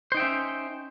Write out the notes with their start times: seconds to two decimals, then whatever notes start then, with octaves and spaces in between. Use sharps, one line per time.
0.12 C5
0.14 D#4
0.17 G5
0.20 E5
0.22 C#4